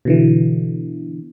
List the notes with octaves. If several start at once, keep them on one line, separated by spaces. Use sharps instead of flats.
B2 D3 E3